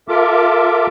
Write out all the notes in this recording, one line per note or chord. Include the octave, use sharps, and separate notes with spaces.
F4 A4 A#4 E5 D6